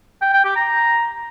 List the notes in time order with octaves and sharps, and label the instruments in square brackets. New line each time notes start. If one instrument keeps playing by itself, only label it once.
[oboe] G5
G5
G4
A#5